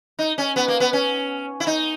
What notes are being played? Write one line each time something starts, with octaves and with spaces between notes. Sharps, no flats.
D#4
C#4
B3
A#3
B3
C#4
E4
D#4